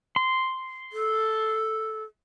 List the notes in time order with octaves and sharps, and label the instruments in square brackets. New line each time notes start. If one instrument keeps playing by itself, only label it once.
[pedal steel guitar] C6
[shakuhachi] A4